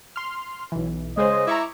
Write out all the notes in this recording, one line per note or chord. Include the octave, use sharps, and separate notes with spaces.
C6 F6
B1 E3
C#3 G#3 G#4 C5 D#5
E4 A#5 C#6 D6